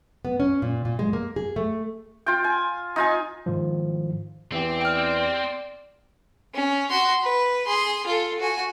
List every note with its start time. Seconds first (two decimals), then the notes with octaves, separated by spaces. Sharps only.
0.25 B3
0.40 C#4
0.62 A#2
0.85 A#2
0.99 G#3
1.13 A#3
1.36 G#4
1.56 A3
2.26 F4 G5
2.44 G#5
2.96 D#4 F4 G#5
3.46 G#2 D#3 F3
4.51 E2 E3 C4 G4
4.81 D5 G5 F6
6.54 C#4
6.90 F#4 C6
7.22 B4
7.67 G#4 C6
8.06 F4 A4
8.40 F#4 G#5